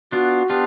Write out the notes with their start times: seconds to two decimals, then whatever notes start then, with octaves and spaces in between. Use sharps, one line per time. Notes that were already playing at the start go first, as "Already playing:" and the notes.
0.12 B3 D4 F4 F#4
0.50 B3 D4 F4 G4